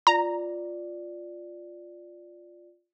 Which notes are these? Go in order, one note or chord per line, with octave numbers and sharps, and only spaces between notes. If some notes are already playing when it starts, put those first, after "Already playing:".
F4 D5 A#5